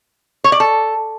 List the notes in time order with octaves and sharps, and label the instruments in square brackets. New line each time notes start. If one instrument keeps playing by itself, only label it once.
[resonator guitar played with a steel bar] C#5
D5
A4